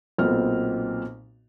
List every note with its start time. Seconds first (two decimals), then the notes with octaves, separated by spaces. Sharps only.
0.18 B1 A#2 B3 C4 F6